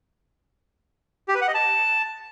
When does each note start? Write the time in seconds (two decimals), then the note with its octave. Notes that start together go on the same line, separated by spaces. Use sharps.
1.28 G4
1.35 B4
1.41 F#5
1.48 D#5
1.54 A5